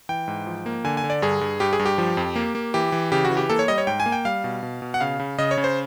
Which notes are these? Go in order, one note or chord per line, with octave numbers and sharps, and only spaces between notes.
E3 G5
G#2
F3
A#3
D3 G#5
G#5
D3
D5
G2 G#4
G2
G2 G4
G#4
G2
G4
F3
F2
A#3
A#3
E3 G4
E3
C#3 G4
F#4
E3
G4
A#3 A4
C#5
G3 D#5
C#5
G#2 G5
G#5
A#3
G5
G3 F5
B2
B2
B2
F#5
C#3 F5
C#3
C#3 D#5
C#5
C#3
C5